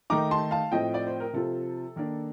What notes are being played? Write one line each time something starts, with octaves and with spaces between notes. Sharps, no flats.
D#3 A3 D#4 A#5 D6
A5 C6
F5 A5
A2 F3 A3 C4 D#5 G5
D5
C5
A#4
C3 F3 C4 F4 A4
D#3 A#3 D4